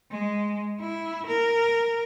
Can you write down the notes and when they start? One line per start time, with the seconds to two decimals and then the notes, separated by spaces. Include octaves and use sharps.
0.11 G#3
0.79 E4
1.27 A#4